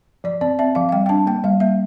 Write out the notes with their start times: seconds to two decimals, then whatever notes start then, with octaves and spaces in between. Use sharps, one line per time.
0.24 F3 D5
0.41 C4 D5
0.59 C4 E5
0.75 F3 F5
0.89 F5
0.92 G3 G5
1.06 G5
1.09 D4 A5
1.27 A#3 G5
1.44 G3 F5
1.60 A#3 E5